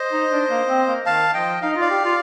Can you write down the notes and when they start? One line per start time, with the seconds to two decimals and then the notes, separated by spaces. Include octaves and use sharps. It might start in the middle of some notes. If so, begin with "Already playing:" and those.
Already playing: C5 D#5
0.12 D#4
0.31 D4
0.50 A#3
0.69 C4
0.88 A#3
1.06 D#3 F5 A5
1.34 F3 D#5 G5
1.62 D#4 F5
1.72 D#5
1.76 F4 D5 F5
1.90 G4
2.05 F4